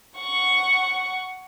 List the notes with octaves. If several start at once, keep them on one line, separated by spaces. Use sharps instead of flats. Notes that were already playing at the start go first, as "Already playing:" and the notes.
F#5 C#6